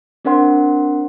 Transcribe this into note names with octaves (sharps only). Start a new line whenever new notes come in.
C4 D4 A#4 C5 F#5 C6